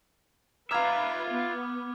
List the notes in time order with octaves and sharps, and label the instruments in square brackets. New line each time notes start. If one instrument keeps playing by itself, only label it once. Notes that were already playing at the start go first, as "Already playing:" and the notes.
[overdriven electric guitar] F4 E5 [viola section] B4 [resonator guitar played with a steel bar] F5 A#5 [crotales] D6 F6 G#6
[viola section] B3